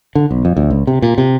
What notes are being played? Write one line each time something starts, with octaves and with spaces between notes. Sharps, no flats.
D3
B1
F2
D2
C#2
C3
A#2
C3